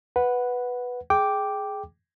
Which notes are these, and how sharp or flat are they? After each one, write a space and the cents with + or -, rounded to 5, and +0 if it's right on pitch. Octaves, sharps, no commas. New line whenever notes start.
B4 +0 F#5 -5
G#4 +15 G5 +0 D6 +0